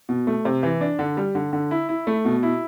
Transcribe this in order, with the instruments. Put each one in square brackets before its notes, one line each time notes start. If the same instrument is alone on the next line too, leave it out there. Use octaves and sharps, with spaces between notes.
[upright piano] B2
A3
C3
E3
D4
D3
G3
D3
D3
E4
E4
A3
B2
E4